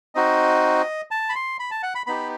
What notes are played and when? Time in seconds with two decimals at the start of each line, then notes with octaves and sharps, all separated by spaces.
0.15 C4 D#4 F#4 D#5
1.11 A5
1.29 B5
1.35 C6
1.60 B5
1.71 A5
1.83 F#5
1.95 B5
2.07 B3 D#4 G4 B5